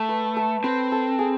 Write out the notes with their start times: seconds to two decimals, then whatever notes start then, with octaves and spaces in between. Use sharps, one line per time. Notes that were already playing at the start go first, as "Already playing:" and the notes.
Already playing: A3 A4
0.09 B4
0.37 A4
0.64 C4 B4
0.92 A4
1.19 G#4